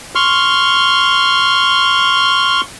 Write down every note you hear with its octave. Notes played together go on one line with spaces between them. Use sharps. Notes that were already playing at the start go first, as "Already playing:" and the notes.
C6 C#6 F6